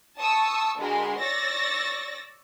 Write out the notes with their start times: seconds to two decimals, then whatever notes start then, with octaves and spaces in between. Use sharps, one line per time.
0.18 A5 C#6 D#6 E6
0.78 D3 G#3 F#4 A#4 B5 C6
1.20 C#5 D5 C#6 E6 A6 A#6